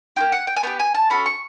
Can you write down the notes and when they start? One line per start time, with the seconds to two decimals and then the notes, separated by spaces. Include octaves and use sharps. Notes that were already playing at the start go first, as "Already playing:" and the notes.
0.16 A#3 D#4 G4 G5
0.32 F#5
0.47 G5
0.56 G#5
0.63 B3 D4 G4 G5
0.79 G#5
0.94 A5
1.10 C#4 F#4 A4 B5
1.26 C#6